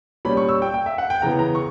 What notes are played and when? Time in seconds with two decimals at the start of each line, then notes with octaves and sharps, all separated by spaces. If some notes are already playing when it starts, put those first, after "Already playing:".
0.25 A#2 G3 C#4 B5
0.37 C#6
0.49 E6
0.62 G5
0.74 G5
0.86 E5
0.98 F#5
1.10 G5
1.22 C#3 E3 B3 A#5
1.39 A#5
1.55 C#6